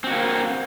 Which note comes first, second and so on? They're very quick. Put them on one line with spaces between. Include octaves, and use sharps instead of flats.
C4 F#4 A#3